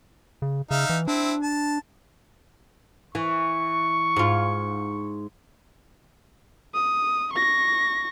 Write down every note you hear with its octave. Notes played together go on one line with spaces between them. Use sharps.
C#3
C#3 D#4 E5 F5
E3
C4 D4 E4
A5
E3 C#6
G#2 F4
D#6
C#6 A#6